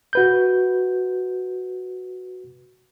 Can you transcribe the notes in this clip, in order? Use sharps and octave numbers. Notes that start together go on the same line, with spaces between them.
F#4 B4 G6